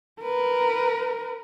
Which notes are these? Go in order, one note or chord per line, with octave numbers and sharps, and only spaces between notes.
A#4 B4